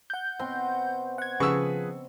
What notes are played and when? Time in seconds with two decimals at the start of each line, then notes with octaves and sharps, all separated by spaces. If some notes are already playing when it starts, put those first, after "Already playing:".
0.10 F#5 G6
0.39 B2 C4 C6
1.18 F#5 G#6
1.40 C#3 F3 G#4 B4 C#6 E6